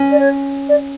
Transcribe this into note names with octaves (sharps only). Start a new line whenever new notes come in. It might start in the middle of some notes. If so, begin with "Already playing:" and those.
Already playing: C#4
D5
C#5
D5